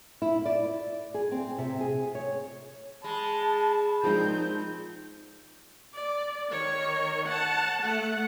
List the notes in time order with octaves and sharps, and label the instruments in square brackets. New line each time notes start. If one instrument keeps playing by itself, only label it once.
[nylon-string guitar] E4
D5
G#4
C4
C3
G#4
C#5
[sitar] G#3 [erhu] A5 [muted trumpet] B5
[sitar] A#2 C4 [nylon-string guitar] F3 G#3 D#4 [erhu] G6
[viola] D5
D#3 C#5
F#5 A5
A3 F#5